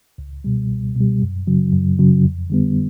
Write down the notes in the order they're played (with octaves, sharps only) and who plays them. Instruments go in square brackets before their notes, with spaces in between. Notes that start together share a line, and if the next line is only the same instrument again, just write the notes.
[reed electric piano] C#2
B2 G3
C#2
B2 G3
F#2
C#3 F#3
F#2
C#3 F#3
F2
D3 G3 B3